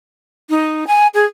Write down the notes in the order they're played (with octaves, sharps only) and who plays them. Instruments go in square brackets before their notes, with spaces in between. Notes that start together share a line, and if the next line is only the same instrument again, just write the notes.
[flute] D#4
G#5
G#4